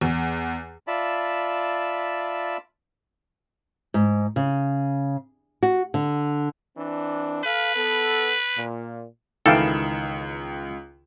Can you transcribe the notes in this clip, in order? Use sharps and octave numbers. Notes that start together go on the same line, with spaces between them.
E2
F4 D5 E5 A5 B5
G#2
C#3
F#4
D3
E3 C4 D4
A4 B4 F5
B3 A4
A#2
C#2 D#3 E3 E4 A4 F5 G5 E7